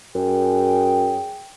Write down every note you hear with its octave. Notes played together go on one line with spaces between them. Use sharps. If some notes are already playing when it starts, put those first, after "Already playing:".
F#2 G#4 G5